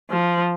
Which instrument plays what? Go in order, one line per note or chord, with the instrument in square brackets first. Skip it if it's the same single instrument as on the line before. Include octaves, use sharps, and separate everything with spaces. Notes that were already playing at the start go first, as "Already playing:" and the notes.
[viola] F3